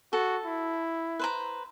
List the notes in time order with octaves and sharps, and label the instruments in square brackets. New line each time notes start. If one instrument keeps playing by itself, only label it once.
[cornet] F#4 [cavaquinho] A4
[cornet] E4
[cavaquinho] B4 C5 A#5